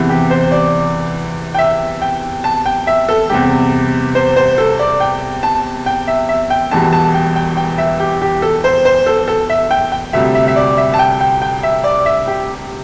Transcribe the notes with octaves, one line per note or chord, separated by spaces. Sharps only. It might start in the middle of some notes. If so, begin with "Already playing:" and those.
Already playing: E2 C3 E3
G4
C5
D5
G5
E5
G5
A5
G5
E5
A4
E2 C3 G3 G4
C5
C5
A4
D5
G5
A5
G5
E5
E5
G5
E1 E2 E3 G3 A5
A5
G5
G5
G5
E5
G4
G4
A4
C5
C5
A4
A4
E5
G5
G5
D2 C3 G3 E5
E5
E5
D5
E5
A5
G5
G5
G5
E5
D5
E5
G4